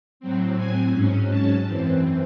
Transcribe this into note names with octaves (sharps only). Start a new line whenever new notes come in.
A2 F#3 C4
G#5
G#2 F#3 C#4
A5
F#2 E3 C4